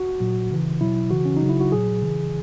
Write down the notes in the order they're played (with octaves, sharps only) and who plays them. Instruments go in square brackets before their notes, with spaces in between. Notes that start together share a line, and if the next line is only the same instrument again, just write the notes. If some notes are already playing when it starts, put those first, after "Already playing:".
Already playing: [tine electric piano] F#4
A#2 F#3
C#3 E3
B2 F#3 E4
C#3 E3 F#4
C#4
D#4
C#3 F#3
E4
F#4
A#2 F#3 G#4
C#3 E3